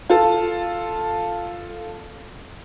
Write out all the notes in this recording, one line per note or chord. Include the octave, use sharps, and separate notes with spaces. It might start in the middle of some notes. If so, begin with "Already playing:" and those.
F4 A4